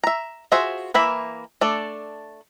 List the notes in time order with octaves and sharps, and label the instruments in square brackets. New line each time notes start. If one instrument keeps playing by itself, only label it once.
[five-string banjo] E5 A#5
F4 F#4 G#4 C5 E5
E3 A#3 E5 B5
A3 D4 A4 D5